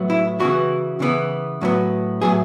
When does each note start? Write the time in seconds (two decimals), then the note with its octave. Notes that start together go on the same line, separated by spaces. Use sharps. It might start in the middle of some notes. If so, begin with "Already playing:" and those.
Already playing: A2 F#3 B3
0.10 E4
0.40 C#3 E3 B3 F#4
1.00 C#3 E3 B3
1.61 A2 F#3 B3
2.21 A2 F#3 B3 G#4